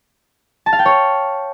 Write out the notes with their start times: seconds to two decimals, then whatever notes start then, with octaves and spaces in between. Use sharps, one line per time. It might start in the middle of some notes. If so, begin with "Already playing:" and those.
0.66 A5
0.73 F5
0.79 G5
0.86 C#5